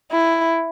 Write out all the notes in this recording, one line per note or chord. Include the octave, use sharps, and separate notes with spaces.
E4